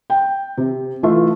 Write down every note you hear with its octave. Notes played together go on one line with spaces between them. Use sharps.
G5
C3
E3 A3 F4